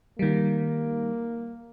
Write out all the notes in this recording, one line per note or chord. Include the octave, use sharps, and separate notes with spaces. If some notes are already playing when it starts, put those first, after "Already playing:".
D#3 G3 A#3